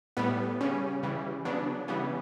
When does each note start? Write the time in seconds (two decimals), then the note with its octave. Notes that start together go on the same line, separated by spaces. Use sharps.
0.17 A2 G3 B3
0.60 C#3 G3 C#4
1.03 C#3 E3 G3
1.45 C#3 F#3 B3 D4
1.88 C#3 E3 G3 B3